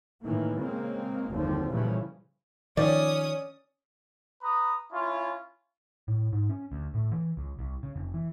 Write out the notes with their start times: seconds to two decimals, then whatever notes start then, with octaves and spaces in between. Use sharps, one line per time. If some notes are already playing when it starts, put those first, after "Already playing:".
0.22 A2 D#3 E3 A#3
0.59 C#3 G#3 A#3 C4
1.31 F#1 D#2 D3 F3 G3 C4
1.71 A#2 C#3 E3 F3 G3 A3
2.77 D#3 F3 C#4 D5 D#6
4.42 B4 A#5 D#6
4.91 C#4 E4 F4
6.08 A2
6.33 G#2
6.49 C#4
6.72 D2
6.94 A2
7.12 E3
7.37 C#2
7.59 C2
7.83 C#3
7.96 F1
8.14 E3